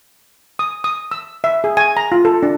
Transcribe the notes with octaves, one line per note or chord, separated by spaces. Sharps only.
D#6
D#6
E6
E5
G#4
G#5
A#5
F4
A4
D4